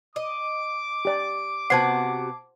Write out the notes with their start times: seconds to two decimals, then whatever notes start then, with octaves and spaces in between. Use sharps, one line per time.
0.16 D#5 D6
1.05 G4 D5
1.70 C3 B3 F#4 C5 F#5 A5 G#6 C7